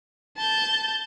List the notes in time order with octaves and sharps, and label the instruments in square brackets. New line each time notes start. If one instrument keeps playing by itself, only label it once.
[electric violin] A5 G6